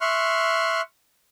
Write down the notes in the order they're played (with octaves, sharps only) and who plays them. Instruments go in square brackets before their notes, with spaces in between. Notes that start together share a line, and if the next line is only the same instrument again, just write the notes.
[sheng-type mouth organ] E5 C6 C#6 F6 F#6